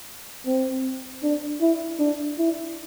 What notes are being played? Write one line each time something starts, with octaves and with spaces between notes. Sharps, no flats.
C4
D4
E4
D4
E4